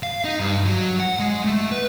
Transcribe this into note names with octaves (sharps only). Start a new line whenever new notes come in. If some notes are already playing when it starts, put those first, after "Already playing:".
F5
D#4
G2
F#3
F#5
G#3
A3
B4